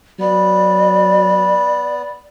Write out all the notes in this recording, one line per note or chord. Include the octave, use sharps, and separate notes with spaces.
F#3 B3 D5